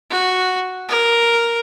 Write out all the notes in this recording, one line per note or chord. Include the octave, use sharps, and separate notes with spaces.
F#4
A#4